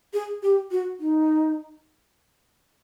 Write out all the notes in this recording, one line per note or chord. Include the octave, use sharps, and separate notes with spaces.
G#4
G4
F#4
D#4